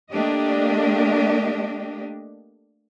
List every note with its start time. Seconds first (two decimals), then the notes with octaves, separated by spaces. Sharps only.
0.11 A3 A#3 D4 G4 D#5